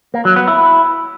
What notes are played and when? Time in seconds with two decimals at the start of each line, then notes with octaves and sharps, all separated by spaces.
0.14 A#3
0.25 F#3
0.36 B3
0.48 E4